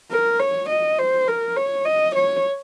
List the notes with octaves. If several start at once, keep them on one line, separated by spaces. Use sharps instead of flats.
A#4
C#5
D#5
C5
A#4
C#5
D#5
C#5